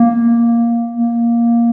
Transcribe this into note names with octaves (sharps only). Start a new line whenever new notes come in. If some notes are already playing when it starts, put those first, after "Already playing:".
Already playing: A#3
A#3